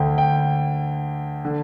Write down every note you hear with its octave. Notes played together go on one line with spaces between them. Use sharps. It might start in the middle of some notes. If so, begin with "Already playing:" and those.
Already playing: D2 D3 G5
G5
D3